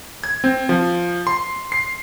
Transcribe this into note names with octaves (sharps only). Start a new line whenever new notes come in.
G#6
C4
F3
C6
C7